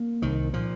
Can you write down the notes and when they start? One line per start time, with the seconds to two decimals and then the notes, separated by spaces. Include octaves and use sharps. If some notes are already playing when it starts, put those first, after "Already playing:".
Already playing: A#3
0.22 C2 D#3
0.53 A#2 F3